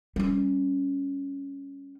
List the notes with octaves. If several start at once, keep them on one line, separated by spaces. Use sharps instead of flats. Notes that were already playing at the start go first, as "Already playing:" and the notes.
G3 C#4